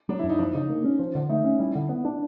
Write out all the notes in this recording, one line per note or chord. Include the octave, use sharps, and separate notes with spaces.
F#3 D4
E4
F#2
D#4
F3 D4
C#3 D#4
A#3
C#4
F3
D3
A3 D#4
C#4
G3 E4
D3
B3
D4